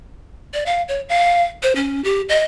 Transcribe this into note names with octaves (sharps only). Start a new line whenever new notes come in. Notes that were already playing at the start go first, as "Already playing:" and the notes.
D5
F5
C#5
F5
C5
C#4
G4
D#5